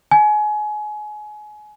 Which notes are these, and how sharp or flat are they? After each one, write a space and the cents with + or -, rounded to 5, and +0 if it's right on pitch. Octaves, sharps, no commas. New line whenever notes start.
G#5 +25